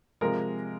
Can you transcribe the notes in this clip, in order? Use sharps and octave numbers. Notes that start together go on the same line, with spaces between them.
C3 F3 G#3 A#4